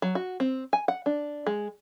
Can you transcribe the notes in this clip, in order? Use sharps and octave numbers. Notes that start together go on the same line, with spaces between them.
F#3
F#4
C4
G#5
F#5
D4
G#3